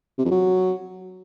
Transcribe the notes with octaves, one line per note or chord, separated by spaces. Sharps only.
C3
F2
F#3